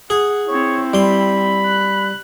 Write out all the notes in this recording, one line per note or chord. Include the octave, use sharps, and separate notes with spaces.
G#4 F#5
C4 E4 C#5
G3 B5 C6
F#6